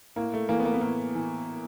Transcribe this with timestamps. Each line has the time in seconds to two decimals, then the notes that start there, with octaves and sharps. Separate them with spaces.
0.16 A2 A#3
0.34 A3
0.49 E3 A#3
0.60 B3
0.65 A#3
0.74 B3
0.81 A2 A#3
1.15 E3